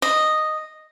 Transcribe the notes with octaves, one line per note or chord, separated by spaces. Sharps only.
D#5